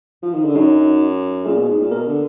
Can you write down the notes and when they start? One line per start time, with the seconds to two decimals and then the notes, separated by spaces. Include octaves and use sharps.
0.22 F3
0.33 D#3
0.44 D3
0.56 F#2 D#4
1.46 A#2 G#4
1.57 B2
1.69 G#2
1.80 A#2
1.92 B2 A#4
2.07 D3